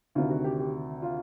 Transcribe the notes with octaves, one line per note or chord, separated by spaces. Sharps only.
D2 C3 D#3 F4
F#4
G4
G4
F4